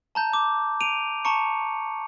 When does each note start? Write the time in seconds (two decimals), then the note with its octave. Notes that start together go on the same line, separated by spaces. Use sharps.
0.15 A5 A#5 G6
0.33 D6
0.81 D7 D#7 F7
1.25 A5 A#5 C#6 C#7